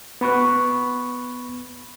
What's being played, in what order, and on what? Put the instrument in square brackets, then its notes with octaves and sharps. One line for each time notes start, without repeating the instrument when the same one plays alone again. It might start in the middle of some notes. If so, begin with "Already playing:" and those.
[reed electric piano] B3 B5 C#6 F#6